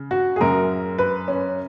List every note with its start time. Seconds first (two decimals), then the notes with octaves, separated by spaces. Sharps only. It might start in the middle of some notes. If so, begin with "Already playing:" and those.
Already playing: C#3
0.11 F#4
0.36 G#4
0.40 F#2 C#3 A#4
0.98 B4
1.28 C#4